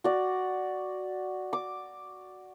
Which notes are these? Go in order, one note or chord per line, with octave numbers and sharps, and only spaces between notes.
F#4 D5
D6